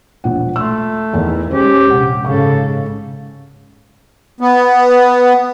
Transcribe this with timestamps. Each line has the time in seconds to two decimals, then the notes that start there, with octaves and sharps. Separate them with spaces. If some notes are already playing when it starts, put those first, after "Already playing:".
0.24 E1 A#1 F#5
0.56 A3 C6 E6
1.14 E2 D#3 E3
1.51 G#3 C#4 G4 G#4 C5
1.90 A#1 C3 F#5
2.24 G#2 C#3 A4 F5 C#6
4.40 B3